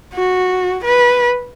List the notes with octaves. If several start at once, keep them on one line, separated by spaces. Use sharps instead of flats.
F#4
B4